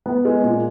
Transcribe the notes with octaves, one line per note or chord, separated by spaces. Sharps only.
B3
G#3
A#2